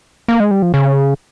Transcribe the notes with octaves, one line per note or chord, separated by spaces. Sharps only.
A#3
G#3
G3
F3
C#3